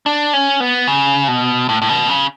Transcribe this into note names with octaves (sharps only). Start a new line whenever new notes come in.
D4
C#4
B3
C#3
B2
A2
A2
B2
C#3